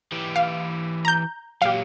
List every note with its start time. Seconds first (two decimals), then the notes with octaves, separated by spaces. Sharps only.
0.12 E3 G4
0.36 F5
1.05 A#5 G6
1.62 A#2 F#3 G4 F5